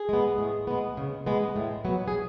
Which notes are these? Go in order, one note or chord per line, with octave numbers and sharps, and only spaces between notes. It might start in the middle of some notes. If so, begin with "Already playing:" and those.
Already playing: G#4
G#3 B3
A2
G#3 B3
C#3
G#3 B3
A2
F#3 B3
G#4